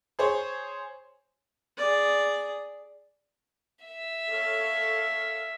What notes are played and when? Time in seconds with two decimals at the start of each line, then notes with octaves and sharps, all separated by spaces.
0.19 G#4 C5 C#5
1.77 G#4 D5
3.85 E5
4.29 A4 C#5 F5